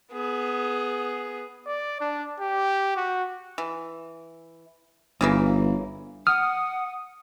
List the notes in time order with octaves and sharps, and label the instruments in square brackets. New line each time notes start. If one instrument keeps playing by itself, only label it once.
[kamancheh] B3 G#4
[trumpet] D5
D4
G4
F#4
[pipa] E3
[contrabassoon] G1 [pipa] C#3 E3 A#3
[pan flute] F#5 [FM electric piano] D#6 [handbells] F6